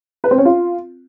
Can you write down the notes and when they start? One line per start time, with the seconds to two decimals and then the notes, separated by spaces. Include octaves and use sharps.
0.24 B4
0.31 C4
0.38 C#4
0.45 F4